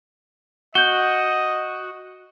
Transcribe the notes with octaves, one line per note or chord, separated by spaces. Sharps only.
F#4 D#5 G6 G7